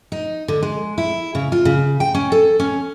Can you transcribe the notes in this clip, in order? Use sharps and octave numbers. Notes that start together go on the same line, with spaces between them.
D#4
D3
G#3
E4
C#3
F4
C#3
G5
C#4
A4
C#4